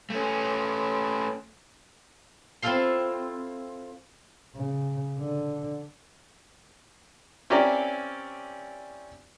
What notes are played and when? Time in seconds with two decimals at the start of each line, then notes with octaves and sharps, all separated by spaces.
0.10 A3 C#4
2.62 C4 E4 F4 A4 F5 C6
4.56 C#3
5.19 D3
7.50 C4 C#4 E4 G4 A#4 D5